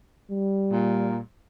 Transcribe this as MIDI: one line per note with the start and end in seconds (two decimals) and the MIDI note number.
0.31 1.22 55
0.71 1.19 46